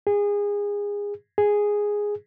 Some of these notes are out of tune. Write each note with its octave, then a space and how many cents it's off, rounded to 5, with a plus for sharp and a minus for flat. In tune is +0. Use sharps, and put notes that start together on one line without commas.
G#4 -25
G#4 -5